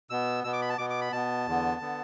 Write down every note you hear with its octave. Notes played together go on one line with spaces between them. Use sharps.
B2 B3 E6
B2 B3 E6
D6
B5
A5
B2 B3 D6
D6
B5
B2 B3 A5
E2 D3 B3
D3 B3